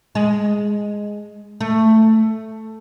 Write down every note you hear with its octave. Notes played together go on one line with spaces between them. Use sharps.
G#3
A3